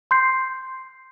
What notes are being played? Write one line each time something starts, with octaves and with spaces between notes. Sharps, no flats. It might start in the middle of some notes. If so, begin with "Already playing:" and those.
C6 G6 C7